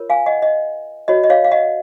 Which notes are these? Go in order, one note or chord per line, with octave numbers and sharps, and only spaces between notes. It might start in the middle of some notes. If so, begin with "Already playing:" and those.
Already playing: F4 A#4 C#5
F5 G#5
D#5 F#5
D#5
F#4 C#5 D#5
D#5
C#5 F5
F5
D#5 F#5